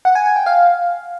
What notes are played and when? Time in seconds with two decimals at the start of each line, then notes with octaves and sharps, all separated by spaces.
0.05 F#5
0.15 G#5
0.26 G#5
0.36 G5
0.46 F5